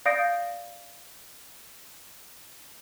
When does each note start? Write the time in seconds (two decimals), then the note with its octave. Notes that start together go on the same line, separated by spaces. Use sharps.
0.06 D5 F5 D#6 G6 A#6 D7